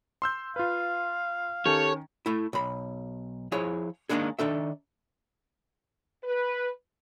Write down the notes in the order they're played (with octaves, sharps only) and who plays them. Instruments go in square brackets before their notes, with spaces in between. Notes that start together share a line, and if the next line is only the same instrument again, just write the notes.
[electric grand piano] C6 E6 G6
[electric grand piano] F4 B4 [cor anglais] F5
[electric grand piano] D#3 C#4 [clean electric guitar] G4 A4 [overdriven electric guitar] C#5
[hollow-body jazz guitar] A3 E4
B1 B5
F3 E4 G#4 C#5
D#3 F#3 G#3 A#3 D4 G#4
D#3 D4 A4 E5
[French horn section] B4